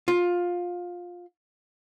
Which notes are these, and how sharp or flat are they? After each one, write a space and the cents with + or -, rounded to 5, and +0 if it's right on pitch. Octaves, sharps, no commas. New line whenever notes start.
F4 +15